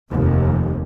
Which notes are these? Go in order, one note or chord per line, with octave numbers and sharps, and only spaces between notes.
F1 D#2 C3